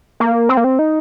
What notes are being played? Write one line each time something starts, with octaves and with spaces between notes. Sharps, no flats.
A#3
C4
A#3
C4
D#4